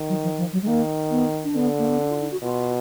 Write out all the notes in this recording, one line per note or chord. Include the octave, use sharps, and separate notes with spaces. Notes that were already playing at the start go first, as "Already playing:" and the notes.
Already playing: D#3
F#3
F3
F3
F#3
G#3
D#3 A#3
B3
D4
D3 B3
A#3
B3
D4
F4
D#4
F#4
B2 F4